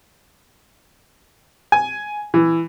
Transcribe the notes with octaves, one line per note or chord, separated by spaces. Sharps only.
G#5
E3